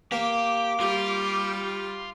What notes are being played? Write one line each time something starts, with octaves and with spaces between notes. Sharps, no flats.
A#3 G4 D6
G3 F4 G4